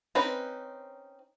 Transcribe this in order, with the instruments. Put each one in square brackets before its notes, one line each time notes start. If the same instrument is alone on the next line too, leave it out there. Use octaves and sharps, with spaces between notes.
[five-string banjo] C4 C#4 D#4 B4